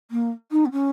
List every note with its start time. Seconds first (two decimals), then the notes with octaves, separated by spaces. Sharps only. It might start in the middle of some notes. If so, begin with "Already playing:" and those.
0.11 A#3
0.51 D#4
0.65 B3
0.71 C#4